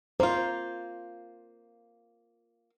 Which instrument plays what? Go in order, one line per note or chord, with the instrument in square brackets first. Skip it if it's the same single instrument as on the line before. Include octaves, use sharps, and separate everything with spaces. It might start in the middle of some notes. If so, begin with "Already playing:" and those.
[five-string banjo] A#3 F4 [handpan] C5